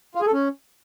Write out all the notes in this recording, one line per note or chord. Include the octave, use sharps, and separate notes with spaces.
F4
G#4
A4
C#4